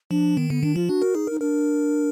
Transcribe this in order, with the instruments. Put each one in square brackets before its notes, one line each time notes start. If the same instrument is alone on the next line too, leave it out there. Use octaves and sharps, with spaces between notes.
[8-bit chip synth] F3 [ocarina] D4
[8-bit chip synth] D#3 [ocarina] B3
[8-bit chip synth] D3 [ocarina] B3
[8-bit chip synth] D#3 [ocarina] D4
[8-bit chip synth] F3 [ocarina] F4
[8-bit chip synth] D4 [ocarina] F#4
[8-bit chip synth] A#4
[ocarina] D#4 [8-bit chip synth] G#4
[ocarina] D#4 [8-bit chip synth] A#4
[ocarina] D4 [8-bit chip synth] A#4